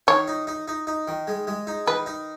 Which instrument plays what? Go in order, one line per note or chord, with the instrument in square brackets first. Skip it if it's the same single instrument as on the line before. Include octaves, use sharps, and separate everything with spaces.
[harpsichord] D#3 [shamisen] C#5
[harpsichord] D#4
D#4
D#4
D#4
D#3
G#3
G#3
D#4
[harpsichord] D#3 [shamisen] B4
[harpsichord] D#4